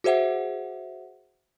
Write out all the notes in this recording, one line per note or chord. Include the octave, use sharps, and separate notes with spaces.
F#4 G#4 C5 E5 F#5